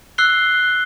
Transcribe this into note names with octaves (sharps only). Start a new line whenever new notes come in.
E6 F#6 C7 G7